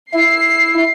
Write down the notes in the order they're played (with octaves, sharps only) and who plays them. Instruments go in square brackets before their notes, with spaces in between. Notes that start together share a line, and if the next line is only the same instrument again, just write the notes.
[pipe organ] E4 [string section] C7